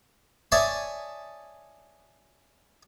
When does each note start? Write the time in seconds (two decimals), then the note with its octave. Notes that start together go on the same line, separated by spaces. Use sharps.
0.52 C#5 D5 E5 G#5 A5 D#6